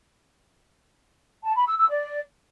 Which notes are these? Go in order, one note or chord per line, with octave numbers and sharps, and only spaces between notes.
A5
B5
E6
E6
D5